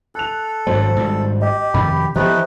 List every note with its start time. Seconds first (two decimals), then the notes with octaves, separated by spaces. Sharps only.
0.15 A4 F#6 F7
0.67 G#1 D2 F#3 C5
0.97 G#2 G3
1.41 G4 D#5
1.74 F2 C3 D#3 B5
2.16 E3 F3 A3 B3 D#4 G4 B4 C5